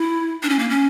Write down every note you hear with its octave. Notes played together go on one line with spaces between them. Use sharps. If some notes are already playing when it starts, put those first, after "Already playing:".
Already playing: E4
D4
C#4
A#3
C#4